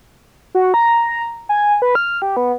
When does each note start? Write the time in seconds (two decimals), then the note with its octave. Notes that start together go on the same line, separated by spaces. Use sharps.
0.55 F#4
0.74 A#5
1.49 G#5
1.82 B4
1.95 F6
2.22 G4
2.37 B3